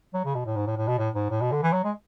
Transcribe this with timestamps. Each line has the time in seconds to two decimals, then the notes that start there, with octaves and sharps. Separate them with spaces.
0.14 F#3
0.25 C#3
0.35 B2
0.46 A2
0.56 G#2
0.67 A2
0.77 A2
0.88 B2
0.99 A2
1.14 G#2
1.30 A2
1.41 B2
1.52 D3
1.62 E3
1.72 F#3
1.84 G#3